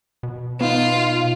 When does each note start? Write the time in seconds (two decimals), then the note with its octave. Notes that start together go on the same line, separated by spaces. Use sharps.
0.23 B2
0.61 B3 D#4 F4